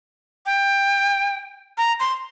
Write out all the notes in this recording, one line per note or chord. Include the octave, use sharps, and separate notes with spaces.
G5
A#5
C6